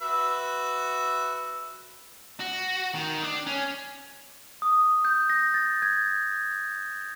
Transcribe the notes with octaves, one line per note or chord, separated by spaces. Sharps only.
F#4 B4 E5
F#4
D#3
D4
C#4
D#6
G6
A#6
A6
G#6